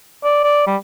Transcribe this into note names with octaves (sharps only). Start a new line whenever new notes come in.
D5
D5
G3